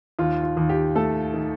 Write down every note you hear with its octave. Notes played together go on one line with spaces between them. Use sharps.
D#2 F4
F4
D#2
G4
A3 A4
D#3